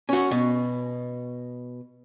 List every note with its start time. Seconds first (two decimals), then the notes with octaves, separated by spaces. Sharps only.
0.09 C#4 F#4
0.31 B2